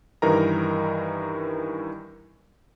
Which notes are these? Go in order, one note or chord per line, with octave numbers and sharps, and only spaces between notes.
G2 D#3 E3 A#4 D#5 A#5